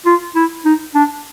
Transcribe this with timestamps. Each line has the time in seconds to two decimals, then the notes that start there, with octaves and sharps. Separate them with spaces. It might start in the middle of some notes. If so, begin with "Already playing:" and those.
0.06 F4
0.36 E4
0.65 D#4
0.95 D4